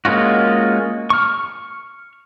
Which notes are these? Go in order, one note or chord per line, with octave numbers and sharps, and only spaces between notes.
G#3 A#3 C#4 F4 F#4
C#6 F6